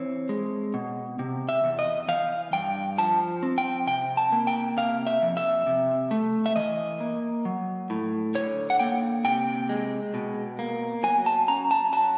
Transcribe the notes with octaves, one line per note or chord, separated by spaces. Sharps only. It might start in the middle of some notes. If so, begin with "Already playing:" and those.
Already playing: E3 C4 C#5
G#3
B2
C3
E5
E2
D#5
E3 F5
G2 G5
F3 A5
C4
G5
C3 G5
A5
A#3
G5
C3 F5
E5
F2
E5
C3
A3
E5
E3 D#5
A#3
F#3
A2
D3 C#5
F#5
A#3 G5
C3 G5
G#3
B2
A#3
F#3 G#5
A5
C#4 A#5
A5
F#3 A5